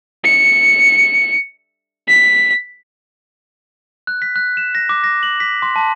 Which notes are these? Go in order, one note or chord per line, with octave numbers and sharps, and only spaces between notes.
C#7
B6
F#6
B6
F#6
E7
A#6
D6
A#6
F#7
B6
C6
A5